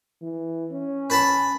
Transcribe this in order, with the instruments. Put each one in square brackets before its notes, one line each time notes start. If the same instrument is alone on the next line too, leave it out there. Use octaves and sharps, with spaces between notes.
[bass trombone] E3
C#4
[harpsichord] B4 A5 B5